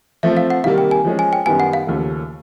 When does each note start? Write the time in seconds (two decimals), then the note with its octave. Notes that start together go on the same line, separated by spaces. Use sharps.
0.23 F3 A3 C4 E5
0.37 F5
0.50 F#5
0.64 C3 D#3 G3 A#3 F5
0.78 G5
0.91 G#5
1.05 F3 G#3 C#4
1.19 G#5
1.33 G5
1.46 F#2 D#3 G3 B3 G#5
1.60 F#5
1.73 F5
1.87 D#2 C#3 F3 A3